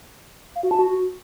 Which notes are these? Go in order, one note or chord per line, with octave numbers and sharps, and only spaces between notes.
F5
F#4
A5
F#4